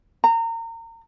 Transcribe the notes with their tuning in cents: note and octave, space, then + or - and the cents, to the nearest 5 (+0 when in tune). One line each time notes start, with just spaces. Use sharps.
A#5 -30